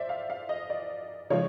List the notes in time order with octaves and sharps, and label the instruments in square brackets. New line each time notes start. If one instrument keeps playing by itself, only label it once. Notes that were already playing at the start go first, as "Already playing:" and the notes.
Already playing: [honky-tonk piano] C5 D5 E5
F5
F5
D#5
D5
C#3 F3 G#3 C#5